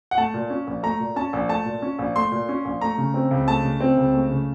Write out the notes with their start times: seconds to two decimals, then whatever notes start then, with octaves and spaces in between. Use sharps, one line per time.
0.11 F#5
0.18 A3 A5
0.34 A#2
0.50 C#4
0.67 A#1
0.83 A3 A#5
1.00 A#2
1.16 C#4 A5
1.33 A#1
1.49 A3 A5
1.66 A#2
1.82 C#4
1.99 A#1
2.16 A3 C6
2.32 A#2
2.49 C#4
2.65 A#1
2.81 A3 A#5
2.98 C#3
3.14 C4
3.31 C#2
3.48 A3 A5
3.64 C#3
3.81 C4
3.97 C#2
4.14 A3
4.30 C#3